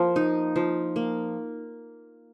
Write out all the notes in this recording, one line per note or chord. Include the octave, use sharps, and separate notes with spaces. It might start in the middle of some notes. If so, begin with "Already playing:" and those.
Already playing: F3 A#3
D#4
F3
A#3